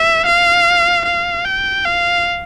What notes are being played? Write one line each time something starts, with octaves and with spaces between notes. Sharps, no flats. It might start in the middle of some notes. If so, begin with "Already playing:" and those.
Already playing: E5
F5
F5
G5
F5